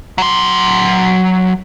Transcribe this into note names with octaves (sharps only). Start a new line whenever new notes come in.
F#3 C6